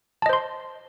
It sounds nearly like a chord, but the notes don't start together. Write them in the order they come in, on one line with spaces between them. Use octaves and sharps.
A5 D#5 C5 C6